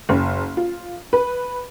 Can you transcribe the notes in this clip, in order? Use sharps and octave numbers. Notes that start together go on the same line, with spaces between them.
F#1
F4
B4